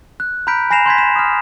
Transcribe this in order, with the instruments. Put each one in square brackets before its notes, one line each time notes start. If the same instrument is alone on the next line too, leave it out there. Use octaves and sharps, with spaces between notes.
[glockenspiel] F#6
A#5 B5 F6 G6 B6 D7
G#5 B5 A#6 C7 E7 F7
C6 G6 G#6 B6
E7
D#6 F6